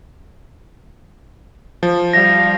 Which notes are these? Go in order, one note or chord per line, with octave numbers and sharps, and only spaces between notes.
F3
G3 F5 A#6